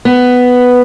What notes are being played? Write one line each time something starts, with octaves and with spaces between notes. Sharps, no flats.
B3